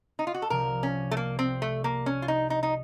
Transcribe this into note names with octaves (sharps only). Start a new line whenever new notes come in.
D#4
F4
F#4
A4
C2 C3 F3 A#4
C#4
A3
A#3
C4
A3
A#3
C#4
F4
D#4
D#4
D#4